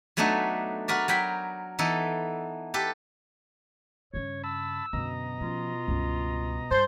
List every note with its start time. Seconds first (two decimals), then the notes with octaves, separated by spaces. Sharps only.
0.17 F#3 A3 B3 D4 D#4 F#4
0.88 F#4 A#4 B4 D5
1.08 F#3 A#4 G5 B5
1.79 E3 B3 D#4 A4
2.74 G4 A4 B4
4.14 G2 C#3 C#5
4.43 A5 B5 E6
4.93 F#2 B2 D3 D#5 A#5
5.41 F3 C#4 F4
5.88 C#2 G2
6.71 G2 C5 A5